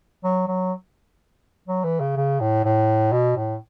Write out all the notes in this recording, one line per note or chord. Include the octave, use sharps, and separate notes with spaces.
F#3
F#3
F#3
E3
C#3
C#3
A2
A2
B2
A2